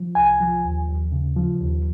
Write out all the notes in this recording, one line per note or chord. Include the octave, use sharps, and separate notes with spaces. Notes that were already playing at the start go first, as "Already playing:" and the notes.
Already playing: F3
C2 G#5
F3
D#2
D#2
C#3
F3
D#2